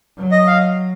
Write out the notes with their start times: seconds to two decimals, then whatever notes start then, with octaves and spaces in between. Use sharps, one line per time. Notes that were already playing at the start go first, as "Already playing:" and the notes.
0.17 F#3
0.32 D#5
0.47 F5